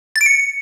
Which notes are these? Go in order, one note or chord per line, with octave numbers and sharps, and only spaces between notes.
A6
D7
C#7